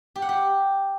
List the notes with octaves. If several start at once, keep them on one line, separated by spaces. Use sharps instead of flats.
G4
F#5
G4